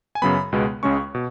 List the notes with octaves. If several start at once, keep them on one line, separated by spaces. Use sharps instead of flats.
G#5
F#2 C#3 F#3 B3 B5
C#2 B2 G#3 B3
C#2 C#3 G#3 C#4 C#6
B2